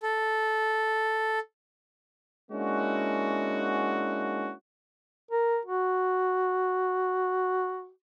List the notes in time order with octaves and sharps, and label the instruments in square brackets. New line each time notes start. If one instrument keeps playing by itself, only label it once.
[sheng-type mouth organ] A4
[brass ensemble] G#3 A#3 C#4 D4 E4 F#4
[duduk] A#4
F#4